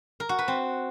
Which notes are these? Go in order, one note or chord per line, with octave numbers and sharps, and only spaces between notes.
A#4
F#4
B4
C4